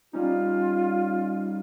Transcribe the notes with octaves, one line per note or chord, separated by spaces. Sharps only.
G3 C#4 D#4 F4